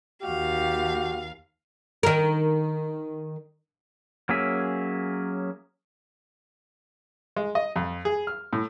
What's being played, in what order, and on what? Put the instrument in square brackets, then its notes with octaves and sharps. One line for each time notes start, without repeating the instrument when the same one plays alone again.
[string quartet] D#2 F5 [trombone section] F#4 G4
[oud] D#3 A#4
[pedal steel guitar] F#3 A#3 C#4 G#4 E5
[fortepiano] G#3
D#5
F2
G#4
F6
A2